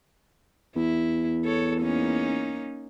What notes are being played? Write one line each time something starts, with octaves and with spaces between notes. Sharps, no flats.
E2 E4
A4 C#5
A#3 C#4 D#4